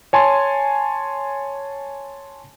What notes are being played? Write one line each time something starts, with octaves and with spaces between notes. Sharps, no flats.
C#5 G#5 A5 C6